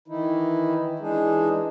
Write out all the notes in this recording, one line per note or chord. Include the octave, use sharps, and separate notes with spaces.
D#3 E3 D#4 E4
E3 G#3 D4 D#4 G#4